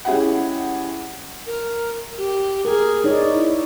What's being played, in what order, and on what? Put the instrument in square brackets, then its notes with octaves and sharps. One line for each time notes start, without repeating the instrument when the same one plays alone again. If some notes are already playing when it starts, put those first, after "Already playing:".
[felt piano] G#3 C#4 E4 G4 G#4 F#5
[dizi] A#4
G4
[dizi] G#4 [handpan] A#4
[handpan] D#4 C#5 D5 [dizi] G#4
[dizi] E4